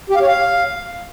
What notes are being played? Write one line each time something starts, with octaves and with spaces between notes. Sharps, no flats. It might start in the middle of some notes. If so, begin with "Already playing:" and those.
G4
F5
C#5
F5